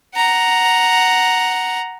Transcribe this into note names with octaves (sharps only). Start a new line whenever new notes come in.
F#5 A#5